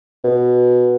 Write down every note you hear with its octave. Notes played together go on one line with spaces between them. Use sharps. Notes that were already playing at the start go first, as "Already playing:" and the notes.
B2